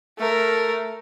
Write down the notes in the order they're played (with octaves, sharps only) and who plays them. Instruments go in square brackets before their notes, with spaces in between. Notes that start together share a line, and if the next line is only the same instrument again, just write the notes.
[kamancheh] A3 A#4